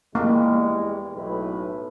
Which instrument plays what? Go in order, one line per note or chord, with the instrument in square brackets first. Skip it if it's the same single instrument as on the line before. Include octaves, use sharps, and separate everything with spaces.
[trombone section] E2 G3 G#3 [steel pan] A#3
[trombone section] B1 A2 B4